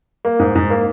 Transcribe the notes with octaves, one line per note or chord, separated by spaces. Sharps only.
A#3
G#2
G#2
A#3